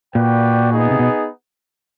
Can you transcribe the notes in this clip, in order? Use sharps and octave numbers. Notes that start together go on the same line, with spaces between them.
A#2 F#4 B4 D5 G5
B3 D#4 G#4
C3
B2